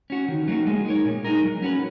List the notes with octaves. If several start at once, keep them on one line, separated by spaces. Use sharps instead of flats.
C#4 F#4
D#3
F#3 A#3 D#4 F#4
G#3
D#4 A#4 C#5
A#2
G#3 D#4 A#4
F#3
C#4 F#4 B4